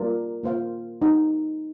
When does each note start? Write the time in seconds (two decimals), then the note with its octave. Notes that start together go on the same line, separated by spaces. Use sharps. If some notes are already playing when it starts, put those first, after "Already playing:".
Already playing: G3 A#3 F4 A#4 D5
0.43 A#3 F4 C5 F5
1.01 D#4 G4 C5